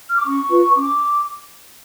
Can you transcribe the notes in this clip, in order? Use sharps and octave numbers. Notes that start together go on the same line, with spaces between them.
F6
D6
C#4 C#6
F4 B4
C#4 D6